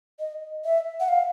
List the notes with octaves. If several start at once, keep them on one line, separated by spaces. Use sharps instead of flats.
D#5
E5
F#5
F5